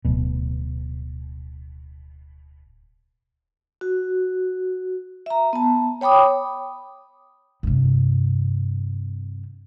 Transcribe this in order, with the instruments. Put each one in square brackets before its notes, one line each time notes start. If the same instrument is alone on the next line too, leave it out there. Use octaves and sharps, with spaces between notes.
[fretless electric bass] D1 B2
[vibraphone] F#4
E5 A#5
B3 A5
C#5 G5 B5 D6 D#6
[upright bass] G2 C3